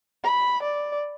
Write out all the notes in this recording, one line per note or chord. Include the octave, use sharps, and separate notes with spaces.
B5
D5